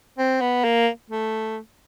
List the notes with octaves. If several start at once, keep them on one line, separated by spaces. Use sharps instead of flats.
C4
B3
A#3
A3